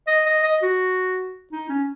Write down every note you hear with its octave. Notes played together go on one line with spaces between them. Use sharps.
D#5
D#5
D#5
F#4
D#4
C#4